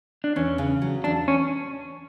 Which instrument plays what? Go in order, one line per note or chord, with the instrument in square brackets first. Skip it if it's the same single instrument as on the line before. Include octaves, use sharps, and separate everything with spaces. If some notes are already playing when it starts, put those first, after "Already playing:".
[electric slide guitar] D4
[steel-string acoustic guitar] E2 [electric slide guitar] C#4
[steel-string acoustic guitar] C#3
F#3
[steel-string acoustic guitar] E2 [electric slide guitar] D4
[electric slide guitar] C#4